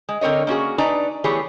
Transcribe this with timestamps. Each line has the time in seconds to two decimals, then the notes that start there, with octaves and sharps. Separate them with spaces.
0.09 G#3
0.21 D3 C4 A#4 C#5 D#5
0.47 A#3 C#4 F#4 G#4
0.78 D4 D#4 B4 D5 G#5 A#5
1.24 E3 A3 B3 G4 G#4 C#5